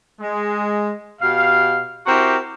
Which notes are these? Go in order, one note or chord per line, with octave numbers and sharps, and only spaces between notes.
G#3
B2 G4 F5
C4 E4 F#4 G4 A#4